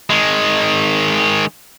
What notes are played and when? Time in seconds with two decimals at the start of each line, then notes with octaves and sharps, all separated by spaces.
0.10 D#3 G#3